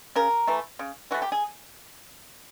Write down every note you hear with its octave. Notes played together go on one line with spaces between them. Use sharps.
C#3 A#4
E3 A3
C#3
E3 A3 F#4
G4
G#4